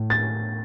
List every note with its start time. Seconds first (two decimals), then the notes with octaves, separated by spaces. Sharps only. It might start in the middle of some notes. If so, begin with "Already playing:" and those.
Already playing: A2
0.10 A6